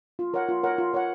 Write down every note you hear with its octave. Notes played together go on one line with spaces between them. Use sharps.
F4
A#4 C#5 F#5
F4
A#4 C#5 F#5
F4
A#4 C#5 F#5